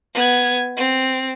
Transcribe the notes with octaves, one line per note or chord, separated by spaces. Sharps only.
B3 G#6
C4